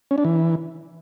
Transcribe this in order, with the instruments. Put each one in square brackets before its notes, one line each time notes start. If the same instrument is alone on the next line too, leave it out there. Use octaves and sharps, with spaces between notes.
[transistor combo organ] C#4
D4
E3